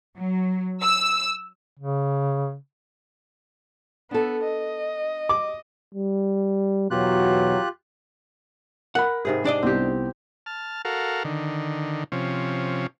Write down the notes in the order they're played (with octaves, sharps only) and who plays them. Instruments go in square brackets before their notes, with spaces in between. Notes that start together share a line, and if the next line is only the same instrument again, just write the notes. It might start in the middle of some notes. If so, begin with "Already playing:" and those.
[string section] F#3
E6
[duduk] C#3
[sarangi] B3 [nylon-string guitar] D4 A4
[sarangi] D#5
[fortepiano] D6
[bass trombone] G3
[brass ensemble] E2 F#3 [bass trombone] B2 [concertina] F4 G4 F#6
[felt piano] A#4 B5 [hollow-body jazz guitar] F#5
[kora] G#2 C3 G#4
[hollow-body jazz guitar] D4 D5 D#5
[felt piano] C2 B3 [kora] C4 G4
[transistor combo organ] A5 F6
F#4 A4 A#4 F5
D3 D#3
C3 F3 C#4